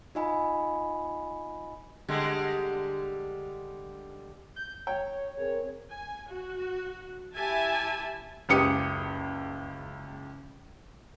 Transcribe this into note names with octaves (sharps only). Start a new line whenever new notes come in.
D#4 F4 D#5 G#5 B5
D3 G3 G#3
G6
C#5 G5
C4 G#4 A#4
G#5
F#4
E4 G4 E5 G#5 A5
F#1 C#2 G4 D#6 C#7